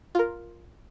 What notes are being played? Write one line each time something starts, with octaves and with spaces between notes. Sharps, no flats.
F4 A#4